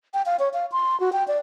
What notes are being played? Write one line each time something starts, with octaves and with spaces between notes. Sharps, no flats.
G5
F5
C#5
F5
C6
F#4
G5
D5